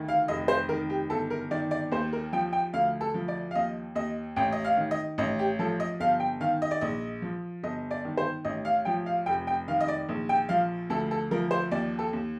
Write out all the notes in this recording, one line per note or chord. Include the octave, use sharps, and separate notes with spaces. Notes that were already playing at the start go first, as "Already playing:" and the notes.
Already playing: D2 D#3
F5
F1 D#5
C5
D#3 A#4
G4
G1 A4
A#4
D#3 D5
D5
D#2 C5
A#4
F3 G5
G5
D2 F5
A4
F3
D5
F5
D#2 D#5
D#2 D#5
A1 G5
D#5
F5
D#3
D#5
A1 D#5
G4
F3 A4
D#5
G1 F5
G5
D#3 F5
D#5
D5
A#1 D#5
F3
G1 D#5
D5
D#3
C5
A1 D#5
F5
F3 G5
F5
F1 G5
G5
D#3 F5
D#5
D5
A#1
G5
F3 F5
D2 A4
A4
F3 A#4
C5
D#2 D5
A4
D#2